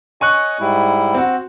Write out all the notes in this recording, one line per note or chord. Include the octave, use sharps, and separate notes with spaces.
C#5 D#5 G#5 C#6 F#6
G#2 G3 E4
C4 F#4